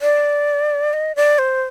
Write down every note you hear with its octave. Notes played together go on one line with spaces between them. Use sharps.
D5
D#5
D5
C5